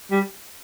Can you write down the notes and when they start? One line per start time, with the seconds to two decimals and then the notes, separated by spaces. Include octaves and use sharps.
0.11 G3